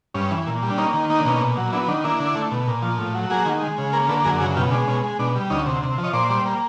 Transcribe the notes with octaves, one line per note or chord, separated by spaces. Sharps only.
G2 C#4
E3
A#2
G3
D4
A#3 C#4 D#4
D#3
A#3 D#4
D4
B2 C#4 D#4
A#2
F#3
B3 D4 E4
D#3 D4
A#3 D4 E4
D3
A3
B2
A#2
F3
A2
F#3
A#3 F#4 G#4
D#3
G#3
C#3
A#3 G#4 A#4
D3 A4 B4
F#2 G#4 A#4
C#3 F#4 G#4
B2 F4 G4
G#3 D4
B2 C#4
G#3
B2 D4
G3
D2 C#4 D#4
C3
C3
F3
C#5 D#5
A#2 C5 D5
G3
A#3